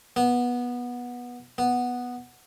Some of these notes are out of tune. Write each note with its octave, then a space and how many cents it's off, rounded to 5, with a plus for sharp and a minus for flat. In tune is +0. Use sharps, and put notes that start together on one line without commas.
B3 -15
B3 -5